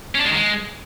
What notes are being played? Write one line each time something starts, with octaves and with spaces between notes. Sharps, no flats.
C#4
D4
G#3
D#3
G#3